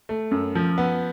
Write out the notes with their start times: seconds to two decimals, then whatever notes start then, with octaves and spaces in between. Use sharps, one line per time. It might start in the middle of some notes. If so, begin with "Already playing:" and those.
0.09 A3
0.31 F#2
0.55 F3
0.78 B3